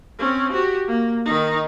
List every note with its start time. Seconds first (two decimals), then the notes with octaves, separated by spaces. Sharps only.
0.19 C4 C#4
0.53 F#4 G4
0.88 A#3
1.26 D#3 D#4